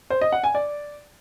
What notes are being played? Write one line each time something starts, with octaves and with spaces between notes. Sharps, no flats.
C5
D#5
F#5
G#5
D5